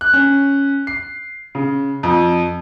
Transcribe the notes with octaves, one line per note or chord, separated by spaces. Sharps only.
F#6
C#4
C7
C#3
F2